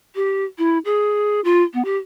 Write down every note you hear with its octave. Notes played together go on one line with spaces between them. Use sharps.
G4
E4
G#4
F4
B3
G4